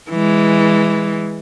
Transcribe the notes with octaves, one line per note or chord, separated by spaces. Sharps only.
E3 G#3